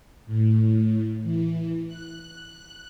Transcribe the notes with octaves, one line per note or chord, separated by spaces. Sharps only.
A2
E3
F#6